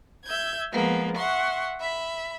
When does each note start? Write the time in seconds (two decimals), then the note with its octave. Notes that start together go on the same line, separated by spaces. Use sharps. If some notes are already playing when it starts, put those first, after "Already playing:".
0.24 E5 G6 G#6
0.72 F3 G#3 A#3 B3
1.16 E5 F#5 C6 C#6
1.79 E5 B5